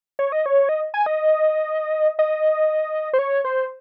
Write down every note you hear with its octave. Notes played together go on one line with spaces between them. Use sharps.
C#5
D#5
C#5
D#5
G#5
D#5
D#5
C5
C#5
C5